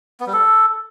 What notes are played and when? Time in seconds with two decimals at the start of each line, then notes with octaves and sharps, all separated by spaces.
0.20 B3
0.27 G3
0.33 A4